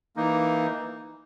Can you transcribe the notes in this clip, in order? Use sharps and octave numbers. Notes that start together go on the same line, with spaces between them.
E3 A#3 D#4